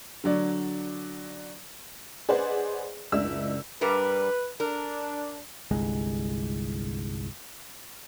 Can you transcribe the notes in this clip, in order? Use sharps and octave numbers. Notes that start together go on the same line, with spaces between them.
D3 F#3 D5
G#4 B4 C5 D5 D#5 F#5
F#1 C#2 G#3 D4 E5 E6
G2 G3 A#4 B4
D4 A#4
G1 C2 G#3